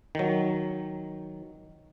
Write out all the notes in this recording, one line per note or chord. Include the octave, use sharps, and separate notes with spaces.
D#3 F#3